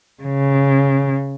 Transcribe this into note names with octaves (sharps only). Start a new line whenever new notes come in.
C#3